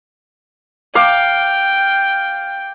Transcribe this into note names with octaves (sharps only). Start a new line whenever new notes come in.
F5 G5 D6